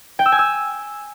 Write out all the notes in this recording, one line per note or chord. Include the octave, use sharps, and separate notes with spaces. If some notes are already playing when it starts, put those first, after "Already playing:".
G5
E6
G#5
E6